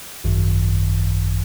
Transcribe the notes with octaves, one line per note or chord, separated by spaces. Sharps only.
G#1 F#2 D#3